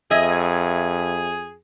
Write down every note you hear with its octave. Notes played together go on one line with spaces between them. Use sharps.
F2 G#4 D#5 E5 G#6